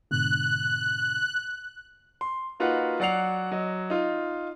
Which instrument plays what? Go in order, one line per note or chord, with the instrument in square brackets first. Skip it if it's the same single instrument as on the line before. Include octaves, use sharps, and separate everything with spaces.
[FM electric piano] G#2 B2 D3 [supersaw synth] F#6
[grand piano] C6
A#3 D#4 F4 F#4 B4 F#5
F#3 D5 F#5 C7 F7
F#3 D#5
D#4 F4